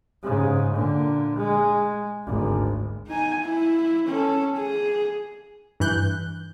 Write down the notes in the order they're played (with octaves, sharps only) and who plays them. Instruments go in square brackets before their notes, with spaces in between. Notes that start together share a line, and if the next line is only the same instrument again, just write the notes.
[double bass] G#2 C#3
A#2 D3
G#3
G#1 D2
[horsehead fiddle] D#4 G#5
E4
C#4 A4
G#4
[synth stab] G2 E3 F#6 G6